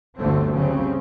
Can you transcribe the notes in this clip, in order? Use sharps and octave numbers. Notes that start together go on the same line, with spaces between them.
G1 D2 D3 F#3 A3 C4
C#3 F#3 G3 C4